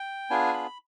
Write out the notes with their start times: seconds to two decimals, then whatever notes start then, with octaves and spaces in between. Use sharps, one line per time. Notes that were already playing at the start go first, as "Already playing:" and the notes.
Already playing: G5
0.30 B3 D4 F4 G#4 G#5
0.54 B5